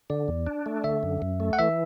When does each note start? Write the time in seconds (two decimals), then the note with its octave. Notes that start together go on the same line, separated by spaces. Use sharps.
0.10 D3 D5
0.28 E2
0.47 D4
0.66 A3
0.84 D3 E5
1.03 F#2
1.22 F#2
1.40 A3
1.53 F#5
1.59 E3 E5